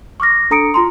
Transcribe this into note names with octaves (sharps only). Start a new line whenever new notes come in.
C#6 D6 F6 A#6
D4 A4 A#5 D#6 C#7 D7
F4 A#5 C6